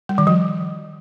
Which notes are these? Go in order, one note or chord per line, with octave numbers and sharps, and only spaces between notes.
G3
D#3
F3